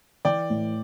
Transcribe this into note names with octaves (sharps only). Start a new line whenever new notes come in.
E3 D5 G5
A2